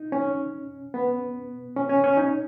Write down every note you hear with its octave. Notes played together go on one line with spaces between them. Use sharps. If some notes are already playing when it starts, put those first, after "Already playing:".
Already playing: D#4
C#4
B3
C#4
C#4
C#4
D#4